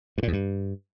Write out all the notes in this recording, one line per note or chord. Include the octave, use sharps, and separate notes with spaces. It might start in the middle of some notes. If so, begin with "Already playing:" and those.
G2
A#2
E2
G2